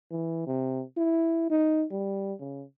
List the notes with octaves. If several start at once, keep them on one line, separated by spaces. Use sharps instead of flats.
E3
C3
E4
D#4
G3
C#3